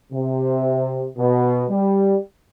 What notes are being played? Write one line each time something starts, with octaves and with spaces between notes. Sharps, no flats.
C3
B2
G3